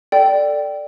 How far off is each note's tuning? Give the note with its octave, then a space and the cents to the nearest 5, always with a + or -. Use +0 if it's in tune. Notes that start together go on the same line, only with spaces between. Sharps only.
A4 +10 D5 +0 G5 -15